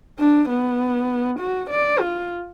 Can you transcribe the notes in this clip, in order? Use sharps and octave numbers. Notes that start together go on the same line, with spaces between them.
D4
B3
F#4
D5
F4